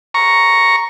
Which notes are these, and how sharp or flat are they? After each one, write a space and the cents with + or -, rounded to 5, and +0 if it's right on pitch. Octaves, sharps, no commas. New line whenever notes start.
A#5 +0 C#6 +0